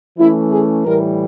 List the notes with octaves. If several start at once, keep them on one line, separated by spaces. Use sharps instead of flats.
E3 A3 C#4 E4
G#4
A2 E3 G3 A#4